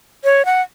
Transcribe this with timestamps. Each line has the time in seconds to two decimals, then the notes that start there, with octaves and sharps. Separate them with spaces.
0.24 C#5
0.45 F#5